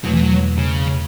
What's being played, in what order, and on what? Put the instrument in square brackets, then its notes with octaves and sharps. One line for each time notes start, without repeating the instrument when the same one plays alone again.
[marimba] E2 B2 A3 [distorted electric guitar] F#3
[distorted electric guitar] E3
F#3
C#3